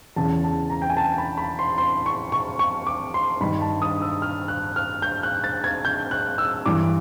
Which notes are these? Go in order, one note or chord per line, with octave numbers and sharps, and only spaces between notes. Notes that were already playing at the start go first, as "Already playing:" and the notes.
E2 C#3 E3 A5
A5
A#5
G5
G#5
A5
B5
B5
C6
C6
C#6
C#6
C#6
D6
C6
G2 D#3 B5
A5
D#6
E6
F6
F#6
F6
G6
F#6
A6
G#6
G6
F#6
E6
G2 E3 D6